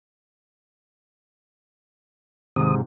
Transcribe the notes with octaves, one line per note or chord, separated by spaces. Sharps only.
G#2 C3 D#3 D#6